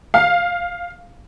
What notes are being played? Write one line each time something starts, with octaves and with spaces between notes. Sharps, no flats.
F5